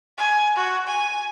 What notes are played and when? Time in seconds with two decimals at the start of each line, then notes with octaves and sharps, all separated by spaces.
0.18 G#5
0.56 F#4
0.87 G#5